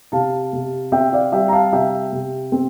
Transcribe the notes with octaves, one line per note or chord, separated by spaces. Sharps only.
C3 F5 A5
C3
C4 E5 G5
D5 F5
G3 E5 G5
A#5
F5 A5
C3 E5 G5
C3
C4